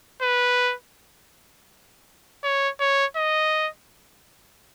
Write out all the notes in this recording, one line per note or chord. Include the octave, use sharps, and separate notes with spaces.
B4
C#5
C#5
D#5